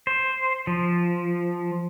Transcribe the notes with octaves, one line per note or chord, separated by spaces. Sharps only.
C5
F3